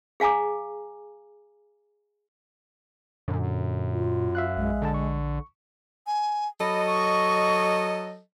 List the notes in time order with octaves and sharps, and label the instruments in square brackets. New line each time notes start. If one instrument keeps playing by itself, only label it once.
[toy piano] G#4 F5 G#5 A#5 D6
[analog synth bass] F#2 [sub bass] A#2 [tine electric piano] D3
[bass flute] F4
[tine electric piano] E5 F5 F#6
[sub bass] A#1 [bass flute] G#3
[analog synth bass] D3 [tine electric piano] A4 A5
[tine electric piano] C#6
[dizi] G#5
[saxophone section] F#3 A4 D#5 [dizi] B5
[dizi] C#6